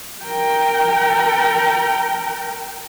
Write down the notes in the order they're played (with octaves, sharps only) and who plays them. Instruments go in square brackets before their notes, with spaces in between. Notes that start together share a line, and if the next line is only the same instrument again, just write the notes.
[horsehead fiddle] A#4 G5